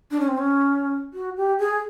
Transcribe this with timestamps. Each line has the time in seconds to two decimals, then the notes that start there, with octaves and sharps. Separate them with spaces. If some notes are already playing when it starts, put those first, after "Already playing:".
0.11 D4
0.20 C#4
0.28 C4
0.38 C#4
1.14 F#4
1.37 G4
1.59 G#4